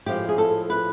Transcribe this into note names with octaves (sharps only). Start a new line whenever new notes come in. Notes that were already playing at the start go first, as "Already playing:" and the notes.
A2 F3 G#3 G4
G#4
A4
B4